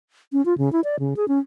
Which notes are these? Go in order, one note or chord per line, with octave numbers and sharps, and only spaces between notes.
C#4
F4
C#3
E4
D5
C#3
G#4
C#4